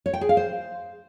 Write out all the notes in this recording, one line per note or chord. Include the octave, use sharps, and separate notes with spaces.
C#5
G5
G#4
F5
C5